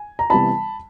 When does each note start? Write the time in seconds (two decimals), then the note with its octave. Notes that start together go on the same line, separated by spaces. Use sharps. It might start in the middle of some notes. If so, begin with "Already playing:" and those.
Already playing: G#5
0.19 A#5
0.30 C3 E3 G3 B3 E4 A5 B5